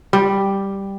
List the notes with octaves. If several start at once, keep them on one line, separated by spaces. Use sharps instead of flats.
G3